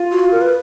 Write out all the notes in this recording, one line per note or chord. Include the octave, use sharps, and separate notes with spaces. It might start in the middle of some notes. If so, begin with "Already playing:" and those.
Already playing: F4
F#4
A#4
B4